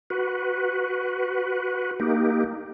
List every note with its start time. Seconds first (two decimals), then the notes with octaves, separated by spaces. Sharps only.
0.10 F#4 B4
2.00 A#3 D#4 G4